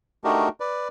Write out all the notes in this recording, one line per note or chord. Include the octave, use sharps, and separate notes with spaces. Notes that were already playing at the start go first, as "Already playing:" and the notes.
A3 D4 D#4 F#4 G4 A#4
B4 D5